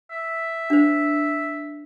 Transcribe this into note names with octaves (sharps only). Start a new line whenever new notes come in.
E5
D4 C5